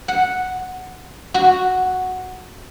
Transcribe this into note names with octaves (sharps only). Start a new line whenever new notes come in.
F#5
F#4